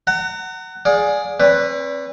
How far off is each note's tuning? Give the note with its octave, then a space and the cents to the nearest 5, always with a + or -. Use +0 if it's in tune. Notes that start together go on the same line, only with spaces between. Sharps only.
F#5 +20 A#5 -35
G#4 +0 D5 +0 F5 +40
C4 +40 B4 +0 D5 -30